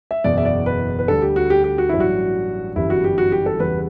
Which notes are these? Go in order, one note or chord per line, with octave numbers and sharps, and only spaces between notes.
E5
F#1 E2 B2 D5
E5
D5
B4
B4
D2 D3 G3 A4
G4
F#4
G4
G4
F#4
A1 G2 F#3 E4
F#4
G1 F#2 E3 G3 E4
F#4
G4
F#4
G4
A4
E2 C#3 G3 B4